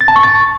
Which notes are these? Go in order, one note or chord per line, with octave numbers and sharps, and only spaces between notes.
A6
A5
C#6
A6